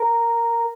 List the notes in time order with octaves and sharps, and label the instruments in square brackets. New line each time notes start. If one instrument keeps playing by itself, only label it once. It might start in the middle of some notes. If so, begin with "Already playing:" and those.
Already playing: [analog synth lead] A#4